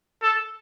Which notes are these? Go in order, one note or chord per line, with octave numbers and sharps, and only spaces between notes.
A4